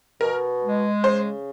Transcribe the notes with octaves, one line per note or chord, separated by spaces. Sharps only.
B2 A#4
G#3
C#3 C5